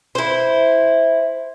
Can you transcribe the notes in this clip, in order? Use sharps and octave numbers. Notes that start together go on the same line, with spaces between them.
E4 C5